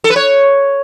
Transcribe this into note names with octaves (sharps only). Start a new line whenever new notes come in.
A4
B4
C#5